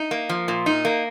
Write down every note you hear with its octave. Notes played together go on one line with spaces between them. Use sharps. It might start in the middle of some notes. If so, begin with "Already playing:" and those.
Already playing: D#4
A#3
F3
A#2
D#4
A#3